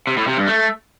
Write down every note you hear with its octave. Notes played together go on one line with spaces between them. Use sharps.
C3
A2
C3
G2
A3